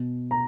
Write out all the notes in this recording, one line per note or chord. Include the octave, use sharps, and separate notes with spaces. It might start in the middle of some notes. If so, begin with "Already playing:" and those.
Already playing: B2
A#5